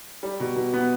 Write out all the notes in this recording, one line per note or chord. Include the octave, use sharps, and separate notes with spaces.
G3
B2
B2
B3